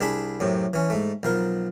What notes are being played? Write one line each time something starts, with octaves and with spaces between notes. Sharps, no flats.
C2 D4 G#4 A5 B5
F#2 A2 C3
E3 C#4
G#2 A3
B1 F3 A#4